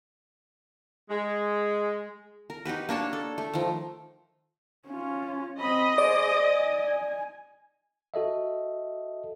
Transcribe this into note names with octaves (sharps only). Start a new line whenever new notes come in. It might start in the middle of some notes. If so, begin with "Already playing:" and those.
G#3
A#4
D#4 F#4 G4 B4
A#3 D4 C#5 A5
A4
A3
D#3 F3
C#4 F4
C4 D#5 B5
G#4 C5 D5
G#5
F#4 A4 D#5 E5